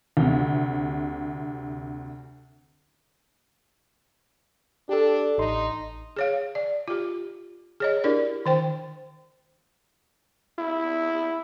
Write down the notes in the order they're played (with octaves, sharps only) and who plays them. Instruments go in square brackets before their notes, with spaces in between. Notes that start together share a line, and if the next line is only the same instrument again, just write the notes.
[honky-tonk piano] D2 C3
[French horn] D4 [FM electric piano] G4 A4
[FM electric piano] A1 C6 [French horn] D#4
[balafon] G#4 C#5 F5
D5
F4 G4
G#4 C#5 D#5
D4 E4 G4 A#4 D5
D#3 C5 G5
[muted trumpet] E4